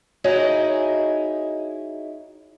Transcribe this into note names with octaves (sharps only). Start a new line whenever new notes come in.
D#4 E4 F#4 G#4 C#5 D#5